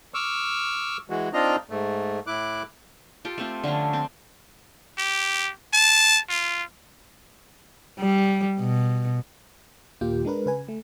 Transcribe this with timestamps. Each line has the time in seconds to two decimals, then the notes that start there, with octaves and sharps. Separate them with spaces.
0.14 C#6 D6 E6 F6
1.10 E3 G#3 F#4
1.33 C4 D4 D#4 F4 D#5 A#5
1.70 G#2 A3
2.27 A2 E4 D6 F#6
3.25 F4 G4 A4
3.38 A3 C4 F4
3.64 D3 F3 C#4 D4
3.93 C4
4.98 G4
5.73 A5
6.29 F4
7.99 G3
8.59 B2
10.01 D#2 A#2 A#3 F4 G4 G5
10.25 G#3 D4 A#4 B4
10.46 C#3 B4 G#5
10.68 A3